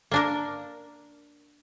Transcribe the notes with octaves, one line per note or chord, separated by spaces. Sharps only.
A#3 D4 A#4